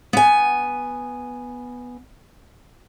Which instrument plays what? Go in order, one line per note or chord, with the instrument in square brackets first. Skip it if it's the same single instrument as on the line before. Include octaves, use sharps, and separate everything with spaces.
[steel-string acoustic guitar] B3 G#5